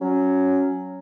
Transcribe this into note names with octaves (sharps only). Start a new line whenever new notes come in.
F#3 C#4